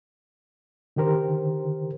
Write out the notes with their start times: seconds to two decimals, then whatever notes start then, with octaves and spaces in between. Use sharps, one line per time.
0.96 D3 D#3 G4 A#4 C5